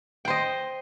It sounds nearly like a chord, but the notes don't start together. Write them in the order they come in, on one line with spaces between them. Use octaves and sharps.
G5 C5 D#5